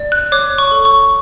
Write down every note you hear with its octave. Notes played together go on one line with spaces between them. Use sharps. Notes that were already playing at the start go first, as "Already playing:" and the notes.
Already playing: D5
F#6
C#5 D6
C#6
A4
C#6